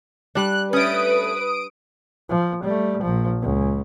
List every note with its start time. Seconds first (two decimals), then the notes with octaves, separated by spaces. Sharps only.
0.35 G3 D4 F#6
0.73 A3 C#4 B4 D#6 D7
2.29 F3
2.64 G3 A3
3.01 A#1 F3
3.41 C#2